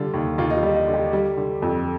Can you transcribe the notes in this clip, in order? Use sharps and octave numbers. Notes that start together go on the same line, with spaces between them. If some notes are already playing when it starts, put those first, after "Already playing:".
Already playing: D3 G3 F4
D#2
D#2 F4
D#4
F4
G3
D#4
D3
G4
G3
D3
F2